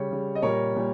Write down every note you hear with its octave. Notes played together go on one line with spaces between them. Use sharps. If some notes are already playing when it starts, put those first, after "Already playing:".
Already playing: C#3 G3 C#5
C#3 G3
D#5
A#2 G3 A#4 C#5
A#2 G3